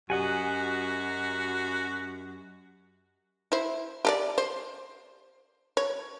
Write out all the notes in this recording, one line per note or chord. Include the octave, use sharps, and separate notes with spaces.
F#2 F#4 G4 D#5 F#5 G#5
E4 C5
G4 A4 D5
C5
C#5